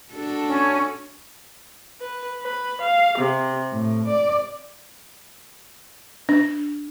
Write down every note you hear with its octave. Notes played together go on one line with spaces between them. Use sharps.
D4 F#4 A4
C#4
B4
B4
F5
C3
A2
D5
D4